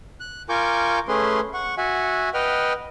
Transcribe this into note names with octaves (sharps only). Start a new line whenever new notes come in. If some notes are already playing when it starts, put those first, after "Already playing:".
F#6
F4 A#4 G#5 C#6 D6 G6
A3 C#4 G#4 B4 C6
F#5 C#6
F#4 E5 F#5 G#5
B4 D#5 F#5 G5 F6